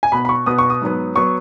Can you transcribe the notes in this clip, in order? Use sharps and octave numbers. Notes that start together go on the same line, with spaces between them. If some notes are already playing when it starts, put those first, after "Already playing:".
G#5
B2 B3 B5
B5
C#6
B2 B3 D#6
C#6
D#6
G#2 F#3 B3
F#3 B3 C#6